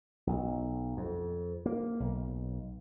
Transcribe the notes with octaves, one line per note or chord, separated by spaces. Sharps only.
B1
F2
A#3
B1